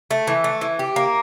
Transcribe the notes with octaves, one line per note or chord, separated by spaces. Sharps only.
A3
E3
A3
E3
G4
A#3